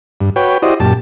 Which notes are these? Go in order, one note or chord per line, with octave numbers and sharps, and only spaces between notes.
G2
F#4 B4 C#5 G5
E4 F#4 G4 C5 D5 D#5
F#2 A#2 G4 A5